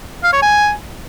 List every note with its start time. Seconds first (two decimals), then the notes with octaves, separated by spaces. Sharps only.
0.24 F5
0.33 C#5
0.42 G#5